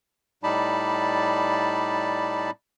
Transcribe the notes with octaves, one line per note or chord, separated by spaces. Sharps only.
A2 G3 D#4 D5 A5 B5